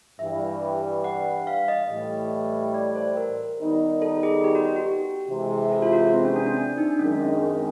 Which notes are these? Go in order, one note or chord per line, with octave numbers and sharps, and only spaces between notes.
G2 E3 G3 E5
F#5
F5
D#5
A2 E3 G3
D5
C5
A#4
D#3 G3 B3 D#4
A4
G#4
G4
F#4
F#4
F#4
G4
C3 E3 G#3
A4
F4
F#4
C4
C#4
D4
D4
D4
D#4
D4
F#2 D#3 G#3 C#4
C4
C#4